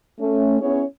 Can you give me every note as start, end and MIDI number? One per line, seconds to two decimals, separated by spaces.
0.19 0.59 57
0.19 0.59 61
0.61 0.83 59
0.61 0.83 61
0.61 0.83 64
0.61 0.83 68
0.61 0.83 73